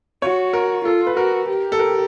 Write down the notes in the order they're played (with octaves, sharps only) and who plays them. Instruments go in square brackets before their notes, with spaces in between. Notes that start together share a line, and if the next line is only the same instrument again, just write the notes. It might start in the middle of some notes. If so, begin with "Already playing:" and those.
[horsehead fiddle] F#4 [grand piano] C#5
[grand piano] A#4
[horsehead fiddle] F4 [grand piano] A4
[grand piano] B4
[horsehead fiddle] F#4 [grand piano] A#4
[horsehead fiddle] G4
[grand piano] A4
A#4